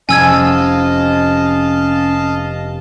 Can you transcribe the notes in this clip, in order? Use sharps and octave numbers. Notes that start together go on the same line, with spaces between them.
F1 C#4 D#5 F5 G#5 A5 E6 G#6